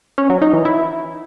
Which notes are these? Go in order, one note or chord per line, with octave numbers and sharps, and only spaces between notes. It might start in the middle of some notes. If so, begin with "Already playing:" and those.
C#4
F#3
D#4
E3
E4